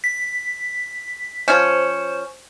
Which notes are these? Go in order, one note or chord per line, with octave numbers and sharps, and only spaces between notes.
B6
F3 C#4 C5